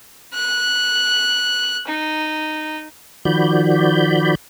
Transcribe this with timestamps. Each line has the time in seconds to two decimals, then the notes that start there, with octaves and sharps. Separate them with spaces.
0.34 F#6
1.87 D#4
3.25 D#3 F3 F#4 D5 B5 G6